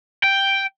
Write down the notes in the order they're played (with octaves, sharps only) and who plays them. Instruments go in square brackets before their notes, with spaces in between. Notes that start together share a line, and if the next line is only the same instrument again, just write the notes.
[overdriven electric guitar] G5